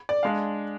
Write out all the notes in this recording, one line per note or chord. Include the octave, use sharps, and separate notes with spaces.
D5
G#3 D4 F5